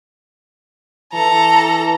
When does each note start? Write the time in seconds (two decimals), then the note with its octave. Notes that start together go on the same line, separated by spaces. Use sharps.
1.14 E3 A4 A#5